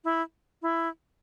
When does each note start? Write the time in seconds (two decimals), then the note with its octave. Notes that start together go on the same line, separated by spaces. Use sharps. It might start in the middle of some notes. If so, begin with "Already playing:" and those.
0.05 E4
0.62 E4